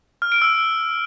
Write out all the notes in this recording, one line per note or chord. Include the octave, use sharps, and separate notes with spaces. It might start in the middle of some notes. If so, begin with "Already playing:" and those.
F6
D7
E6